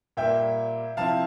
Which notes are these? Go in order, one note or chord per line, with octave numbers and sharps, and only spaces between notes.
A#2 G3 A#3 E5 G5
C3 F3 C4 E4 F5 A5